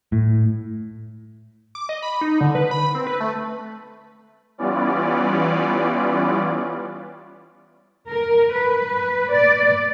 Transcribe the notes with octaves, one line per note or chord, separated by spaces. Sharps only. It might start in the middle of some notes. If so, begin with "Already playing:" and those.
A2
D6
D#5
B5
D#4
D3
B4
B5
C4
B4
A3
E3 G3 B3 C#4 F4 D5
A#4
B4
D5